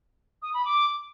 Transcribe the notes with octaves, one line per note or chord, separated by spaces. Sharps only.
D#6
B5
D6